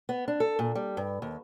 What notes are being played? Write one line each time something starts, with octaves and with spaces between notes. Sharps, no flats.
B3
D4
A4
A#2
G3
G2
D#2